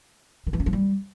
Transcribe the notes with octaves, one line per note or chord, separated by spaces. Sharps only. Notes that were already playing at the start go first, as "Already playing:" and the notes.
D#3
E3
C#4
F3
G3